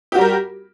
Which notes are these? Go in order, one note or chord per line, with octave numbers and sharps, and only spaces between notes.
G3 F#4 G4 A#4